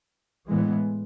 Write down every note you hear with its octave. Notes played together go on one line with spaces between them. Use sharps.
A2 E3 G#3 B3